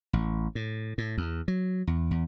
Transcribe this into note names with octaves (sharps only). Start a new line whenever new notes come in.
A1
A2
A2
E2
F#3
E2
E2